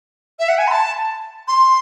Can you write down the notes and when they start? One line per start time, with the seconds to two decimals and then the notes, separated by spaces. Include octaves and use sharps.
0.39 E5
0.48 F#5
0.58 G#5
0.67 C6
0.71 A5
1.48 C6